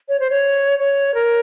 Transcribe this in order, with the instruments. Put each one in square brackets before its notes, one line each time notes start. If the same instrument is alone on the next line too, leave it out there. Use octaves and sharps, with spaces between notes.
[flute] C#5
C5
C#5
C#5
A#4